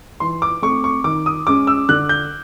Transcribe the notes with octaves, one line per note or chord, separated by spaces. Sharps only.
E3 C6
D6
A3 C4 C#6
C#6
D#3 D6
D#6
G#3 C#4 D6
E6
D3 F#6
G6